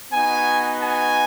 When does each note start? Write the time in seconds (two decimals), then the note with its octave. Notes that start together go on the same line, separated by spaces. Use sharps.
0.12 B3 D#4 F#4 G#5
0.82 G#5